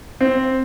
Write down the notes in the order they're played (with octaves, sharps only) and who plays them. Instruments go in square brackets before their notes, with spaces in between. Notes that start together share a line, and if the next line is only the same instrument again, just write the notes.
[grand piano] C4